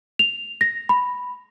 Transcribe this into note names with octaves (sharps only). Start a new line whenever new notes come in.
F7
A#6
B5